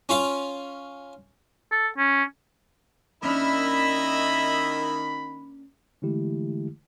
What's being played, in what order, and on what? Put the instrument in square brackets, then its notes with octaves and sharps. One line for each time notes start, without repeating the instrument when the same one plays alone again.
[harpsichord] C#4 F4 F5
[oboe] A4
C#4
[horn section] D#3 B5 [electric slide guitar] A#3 C#4 D4 [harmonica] E4 D#5 E5
[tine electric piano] D3 E3 G#3 A3 E4 G4